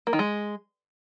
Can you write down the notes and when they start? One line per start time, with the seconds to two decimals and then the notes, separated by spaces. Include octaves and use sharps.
0.07 A#3
0.13 D#3
0.19 G#3